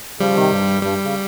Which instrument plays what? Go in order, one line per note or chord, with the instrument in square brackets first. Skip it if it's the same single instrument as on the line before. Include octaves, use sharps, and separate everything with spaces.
[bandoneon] C#3 F3 [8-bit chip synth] G3
[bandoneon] C3 D#3
G2
[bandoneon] G2 [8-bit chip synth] G3
[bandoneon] C#3